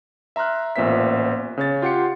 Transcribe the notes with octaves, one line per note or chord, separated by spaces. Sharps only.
E5 A#5 C6 F6 F#6
A1 A#2 B3 C5 E5 B6
C#3 C#5 A6
F4 G4 F#5 C6 C#7